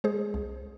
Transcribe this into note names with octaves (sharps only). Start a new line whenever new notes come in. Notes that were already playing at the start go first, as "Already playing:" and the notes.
G#3 G#4 C5
C2